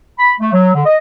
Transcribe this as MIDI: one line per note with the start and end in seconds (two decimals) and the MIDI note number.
0.18 0.32 83
0.40 0.51 57
0.52 0.72 54
0.74 0.84 50
0.86 0.98 75